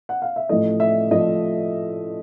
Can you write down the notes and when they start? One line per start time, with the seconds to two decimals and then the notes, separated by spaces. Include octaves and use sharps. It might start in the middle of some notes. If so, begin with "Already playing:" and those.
0.09 F#5
0.22 F5
0.36 E5
0.49 A1 A2 F3 A3 D#5
0.80 E5
1.11 A2 F3 A3 D#5